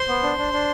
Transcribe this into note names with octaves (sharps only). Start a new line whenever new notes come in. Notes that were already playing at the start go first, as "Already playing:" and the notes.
Already playing: C5 C6
B3
D4
D4
D4